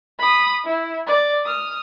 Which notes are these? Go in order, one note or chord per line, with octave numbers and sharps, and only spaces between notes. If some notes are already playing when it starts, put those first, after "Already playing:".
B5 D#6
E4
D5
D#6 F6